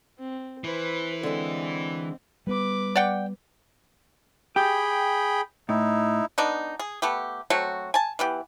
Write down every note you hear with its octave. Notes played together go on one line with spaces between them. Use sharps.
C4
E3 E4 B4 C5
D3 G#3 C4
G3 B3 B4 D6
D5 F#5 G5
G4 G#4 G5 B5
A2 D#4 E4
B3 D4 D#4
G#4
A3 B3 G4
F#3 A3 C4 F#4
G#5 A5
E3 B3 G4